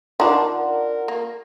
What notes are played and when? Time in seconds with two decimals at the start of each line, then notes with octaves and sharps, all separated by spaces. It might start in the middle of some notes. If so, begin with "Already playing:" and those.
0.20 D#3 D4 F4 A#4 D5 F#5 A#5 C6
0.55 A#4
1.08 A#3